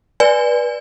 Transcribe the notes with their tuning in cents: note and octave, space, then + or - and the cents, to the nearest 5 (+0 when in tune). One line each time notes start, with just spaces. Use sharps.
B4 -25 D5 +0 G#5 +0